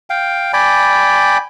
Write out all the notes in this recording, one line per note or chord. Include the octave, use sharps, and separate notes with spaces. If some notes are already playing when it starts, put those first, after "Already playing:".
F5 G5
D5 G5 G#5 B5